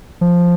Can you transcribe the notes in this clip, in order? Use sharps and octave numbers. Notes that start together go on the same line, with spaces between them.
F3